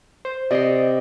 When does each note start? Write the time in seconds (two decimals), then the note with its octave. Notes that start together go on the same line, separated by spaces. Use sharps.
0.25 C5
0.51 C3 D5 D#5 C6